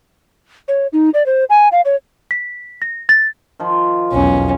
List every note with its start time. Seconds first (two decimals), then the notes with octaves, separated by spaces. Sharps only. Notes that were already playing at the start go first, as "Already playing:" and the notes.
0.68 C#5
0.93 D#4
1.14 D5
1.26 C5
1.50 G#5
1.72 F5
1.85 C#5
2.31 B6
2.82 A#6
3.09 A6
3.59 D#3 F3
4.13 B1 E2 C#4